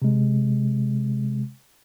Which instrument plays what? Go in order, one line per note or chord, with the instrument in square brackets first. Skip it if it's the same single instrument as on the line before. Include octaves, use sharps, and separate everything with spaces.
[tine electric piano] C3 G#3